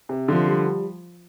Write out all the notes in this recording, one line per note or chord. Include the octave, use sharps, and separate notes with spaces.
C3
D3 F3
G3